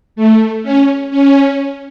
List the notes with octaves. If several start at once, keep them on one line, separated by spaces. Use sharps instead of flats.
A3
C#4
C#4